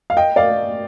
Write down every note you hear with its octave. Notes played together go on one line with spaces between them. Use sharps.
F5
D#5 G5
D5 F5